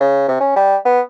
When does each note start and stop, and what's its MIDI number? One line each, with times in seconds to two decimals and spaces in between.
0.01 0.24 49
0.29 0.39 48
0.41 0.55 61
0.56 0.76 55
0.85 1.01 59